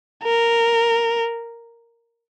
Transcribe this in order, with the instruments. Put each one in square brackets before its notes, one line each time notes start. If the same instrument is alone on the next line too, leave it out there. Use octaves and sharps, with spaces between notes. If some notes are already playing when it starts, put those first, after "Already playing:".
[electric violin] A#4